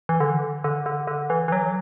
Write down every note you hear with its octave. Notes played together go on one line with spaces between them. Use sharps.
E3
D3
D3
D3
D3
E3
E3
F#3